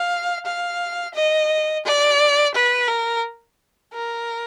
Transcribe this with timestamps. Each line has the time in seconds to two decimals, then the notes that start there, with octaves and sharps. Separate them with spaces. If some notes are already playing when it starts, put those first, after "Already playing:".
Already playing: F5
0.45 F5
1.14 D#5
1.85 D5
2.54 B4
2.88 A#4
3.93 A#4